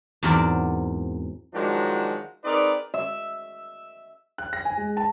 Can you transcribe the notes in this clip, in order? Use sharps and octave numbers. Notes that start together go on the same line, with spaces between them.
E2 G#2 F#3 C4 A#4 D5
D#3 F3 F#3 G#3 D4 F#4
C4 D#4 G#4 A#4 B4 D5
E5
F#6
A#6
G#5
G#3
A5